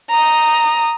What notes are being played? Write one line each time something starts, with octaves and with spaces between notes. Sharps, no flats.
A#5 D#6